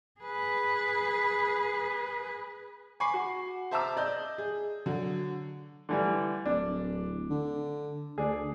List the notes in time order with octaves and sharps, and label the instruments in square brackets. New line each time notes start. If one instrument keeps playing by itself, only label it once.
[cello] G#4 B4
[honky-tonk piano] G#5 B5 C#6 D6 C7
F#4
C5 E5 A5 A#5 D6 E6
D5 D#5 G6
G#4
D3 F#3
[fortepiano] D3 E3 G3
[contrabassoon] D1 [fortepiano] D4
[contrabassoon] D3
[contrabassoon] D2 [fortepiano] D4 G#4